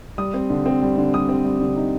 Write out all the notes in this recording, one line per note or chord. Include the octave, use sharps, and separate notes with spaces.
G3 D#6
C4
D3
C4
G3
D3
G3 D#6
C4
G3
D3
D#4